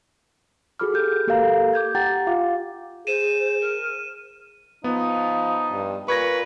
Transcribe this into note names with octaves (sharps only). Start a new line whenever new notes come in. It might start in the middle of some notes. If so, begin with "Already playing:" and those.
F#4 G#4 A4 B5 D6 F6
G4 G6
A#3 G4 A4 A#4 F5 A#5
D6 G6 G#6
G4 F#5 G5 A#5 A6
F4 F5 D6
G#4 C5 D#7 E7
A#4
F3 B3 D#4
G2
A#2 B4 C#6 G#6 A#6